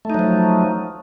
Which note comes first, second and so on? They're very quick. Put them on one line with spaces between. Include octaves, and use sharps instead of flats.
A3 D#4 F#3 F3